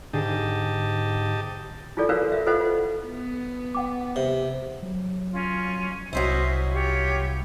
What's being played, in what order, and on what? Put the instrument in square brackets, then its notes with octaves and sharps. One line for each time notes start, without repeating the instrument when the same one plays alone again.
[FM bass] G#2 [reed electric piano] D3 G#4 [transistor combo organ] G4 D#5 A5
[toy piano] E4 F4 G#4 A4 D5
E4 F#4 A#4 B4 C#5 F5
E5 F5
F4 A4 B4 C5 D#5 F#5
F4
[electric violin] B3
[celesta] F#5 G5 D6
[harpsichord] C3
[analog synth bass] F#3
[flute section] C#4 F4
[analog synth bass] C2 [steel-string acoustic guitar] F#3 C#4 E4 [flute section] C5 D#5 E5
[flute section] F4 G4 C#5